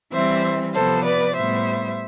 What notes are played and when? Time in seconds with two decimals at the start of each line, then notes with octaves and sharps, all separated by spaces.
0.12 E3 G3 C4 C5 E5
0.73 C3 F3 B3 A4 C5
1.04 B4 D5
1.35 A2 G3 B3 C5 E5